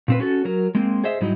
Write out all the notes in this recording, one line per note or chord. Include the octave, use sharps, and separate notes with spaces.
A#2 C4 B4
C#4 F#4 A4
F#3 A#4
G#3 A#3 C4
G#4 C5 D#5 E5
G#2 F#3 G3 D#4 E4 D#5